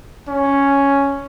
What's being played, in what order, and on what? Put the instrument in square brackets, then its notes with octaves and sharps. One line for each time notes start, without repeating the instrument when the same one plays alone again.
[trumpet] C#4